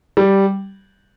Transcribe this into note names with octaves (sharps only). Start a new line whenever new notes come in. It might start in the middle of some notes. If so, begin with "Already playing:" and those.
G3